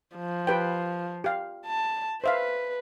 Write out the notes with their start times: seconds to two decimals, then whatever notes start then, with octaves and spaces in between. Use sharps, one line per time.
0.16 F3
0.47 G4 B4 G5
1.24 G4 F5
1.66 A5
2.24 B4 C5 E5 F5